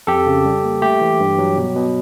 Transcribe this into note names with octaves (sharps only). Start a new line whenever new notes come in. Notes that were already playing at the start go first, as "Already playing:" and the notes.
F2 G4 A4
C#3
G3
A#3
A3 G4
E3
G2
F#3
B2
B2